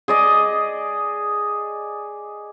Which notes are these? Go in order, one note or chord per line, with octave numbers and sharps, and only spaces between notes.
G#4 D5 D#5